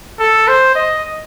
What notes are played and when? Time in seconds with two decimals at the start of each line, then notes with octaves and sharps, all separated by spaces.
0.19 A4
0.48 C5
0.75 D#5